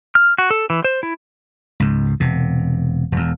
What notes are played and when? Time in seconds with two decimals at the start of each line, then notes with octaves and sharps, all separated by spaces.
0.15 F6
0.38 F#4
0.51 A4
0.70 E3
0.84 C5
1.03 E4
1.80 C#2 G#2
2.20 E1 C3
3.12 E1 E2